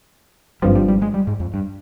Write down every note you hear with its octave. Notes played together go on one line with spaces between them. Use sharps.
G#1 G2 F3 G3
G3
G3
G#3
G3
G#2
F2
G2